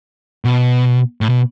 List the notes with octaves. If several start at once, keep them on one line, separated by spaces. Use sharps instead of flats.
B2
A2
B2